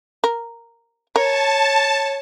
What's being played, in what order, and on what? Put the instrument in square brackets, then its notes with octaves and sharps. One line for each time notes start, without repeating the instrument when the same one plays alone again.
[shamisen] A#4
[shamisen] A#4 [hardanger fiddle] C#5 [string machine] A5